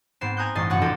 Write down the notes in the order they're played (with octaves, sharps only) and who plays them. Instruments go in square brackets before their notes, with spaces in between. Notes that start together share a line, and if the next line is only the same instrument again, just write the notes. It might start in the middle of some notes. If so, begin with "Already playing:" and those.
[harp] G#2 B3 C4 C7 E7
G#5 A#5 D#6 F#6 G6
A1 G2 D#5 C#6 A6 C7
F1 F#2 F#5 C#6 A6
D4 D#4 F4 G4 A4 D#5